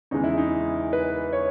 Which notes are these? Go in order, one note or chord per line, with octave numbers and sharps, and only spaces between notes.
E2 C#3 G#3 D#4
E4
D#4
B4
C#5